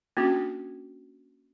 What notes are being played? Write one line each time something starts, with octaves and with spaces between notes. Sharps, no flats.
A#3 C#4 D4 F#4 G4